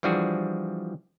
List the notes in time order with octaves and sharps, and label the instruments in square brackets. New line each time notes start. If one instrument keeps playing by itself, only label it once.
[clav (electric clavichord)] E3 F3 G3 D4 F#4 G#4